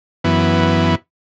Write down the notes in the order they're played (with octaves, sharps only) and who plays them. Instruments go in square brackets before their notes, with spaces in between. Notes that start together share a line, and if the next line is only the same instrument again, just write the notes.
[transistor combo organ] F#2 E3 B3